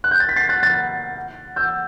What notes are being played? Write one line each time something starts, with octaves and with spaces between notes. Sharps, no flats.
F#6
G6
A6
B6
A6 C7
F#6 A6
F#6 A6
E6 G6